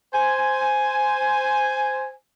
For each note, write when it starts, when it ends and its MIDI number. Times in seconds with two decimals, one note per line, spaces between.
0.14 2.12 72
0.14 2.12 80